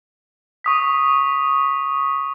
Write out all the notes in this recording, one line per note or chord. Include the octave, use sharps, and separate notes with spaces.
C#6 D#6 B6